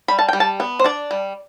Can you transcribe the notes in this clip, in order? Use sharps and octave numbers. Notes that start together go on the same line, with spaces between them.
G3 B5
A5
G3 G5
A5
B3
C5
D4 D5
G3